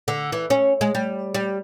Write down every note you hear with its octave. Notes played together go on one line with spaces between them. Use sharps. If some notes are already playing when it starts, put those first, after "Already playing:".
D3
E3
C#4
G#3
G3
G3